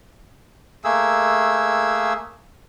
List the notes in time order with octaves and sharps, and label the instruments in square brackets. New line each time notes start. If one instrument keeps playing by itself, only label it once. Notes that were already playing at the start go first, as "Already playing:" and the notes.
[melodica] A3 A#3 G#4 E6